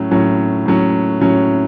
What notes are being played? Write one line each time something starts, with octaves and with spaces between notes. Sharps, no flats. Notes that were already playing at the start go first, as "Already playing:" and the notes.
Already playing: A2 F#3 C#4
A2 F#3 C#4
A2 F#3 C#4
A2 F#3 C#4